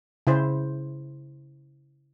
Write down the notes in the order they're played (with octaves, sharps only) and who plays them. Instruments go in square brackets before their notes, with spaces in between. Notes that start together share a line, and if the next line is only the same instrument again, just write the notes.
[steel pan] C#3 E4 C5